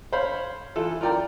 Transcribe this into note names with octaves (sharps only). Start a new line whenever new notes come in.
C5 C#5 F5 B5
E3 E4 F4 A4
F4 A#4 D5 G5 A#5